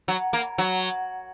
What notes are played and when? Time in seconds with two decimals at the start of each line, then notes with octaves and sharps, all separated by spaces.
0.08 F#3
0.33 A#3
0.58 F#3